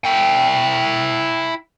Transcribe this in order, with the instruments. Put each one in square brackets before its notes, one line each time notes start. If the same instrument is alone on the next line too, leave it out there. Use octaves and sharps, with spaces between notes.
[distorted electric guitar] E4 G5